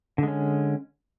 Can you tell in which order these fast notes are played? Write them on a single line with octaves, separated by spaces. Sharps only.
D3 G#3 C#4